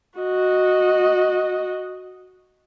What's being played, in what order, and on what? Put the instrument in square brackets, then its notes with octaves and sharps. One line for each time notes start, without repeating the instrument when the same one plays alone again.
[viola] F#4 D#5